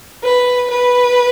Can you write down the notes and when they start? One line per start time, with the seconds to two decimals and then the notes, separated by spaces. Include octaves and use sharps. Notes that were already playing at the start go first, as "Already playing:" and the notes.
0.23 B4
0.70 B4